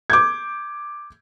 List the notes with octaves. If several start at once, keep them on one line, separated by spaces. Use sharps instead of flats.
D6 G6 G#6